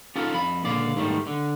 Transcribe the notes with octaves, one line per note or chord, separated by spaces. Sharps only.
C#4 D#4 F4 A4
F2 B5
C#2 A#2 D3 D5 F5
G#2 D#3 G3 A3
D3